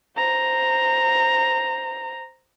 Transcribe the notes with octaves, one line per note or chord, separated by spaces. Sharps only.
C5 A#5